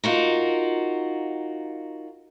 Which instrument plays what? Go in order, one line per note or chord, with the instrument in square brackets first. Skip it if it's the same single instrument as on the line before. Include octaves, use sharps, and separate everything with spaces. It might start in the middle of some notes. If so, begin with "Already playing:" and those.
[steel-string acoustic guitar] D#4 F4 F#4 A#4